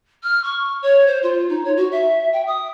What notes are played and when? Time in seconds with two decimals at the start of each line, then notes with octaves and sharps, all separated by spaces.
0.23 F6
0.44 C#6
0.82 C#5
1.07 C5
1.22 F4
1.49 D#4
1.64 C#5
1.76 F#4
1.91 E5
2.33 G5
2.47 D#6